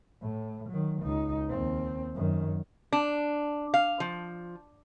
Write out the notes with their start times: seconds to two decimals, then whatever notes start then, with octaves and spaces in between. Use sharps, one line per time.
0.21 A2
0.69 D#3 F#3
1.02 C#2 D#4
1.48 D#2 C4
2.15 F#2 D#3
2.93 D4
3.74 F5
4.00 F3